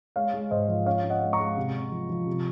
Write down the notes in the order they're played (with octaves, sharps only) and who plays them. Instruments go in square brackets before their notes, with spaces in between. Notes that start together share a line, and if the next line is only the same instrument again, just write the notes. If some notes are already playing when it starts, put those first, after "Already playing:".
[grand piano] G#3 C#5 F5
G#3
G#2 C5 D#5
F3
C#4 C#5 F5
C#4
D#5 F#5
G#3
A#5 C#6
G#3
C3
C3
F3
F3
C3